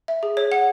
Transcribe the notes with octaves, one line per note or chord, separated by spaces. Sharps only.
E5
G#4
C#5
F#5